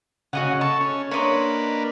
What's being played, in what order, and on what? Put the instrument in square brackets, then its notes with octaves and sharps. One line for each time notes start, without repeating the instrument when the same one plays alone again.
[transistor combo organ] C#3 [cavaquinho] F#4 D#5 F#5
[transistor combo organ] A4 [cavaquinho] C#6
[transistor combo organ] C#4
[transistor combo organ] A#3 D4 B4 [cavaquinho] C#5 D#5 C6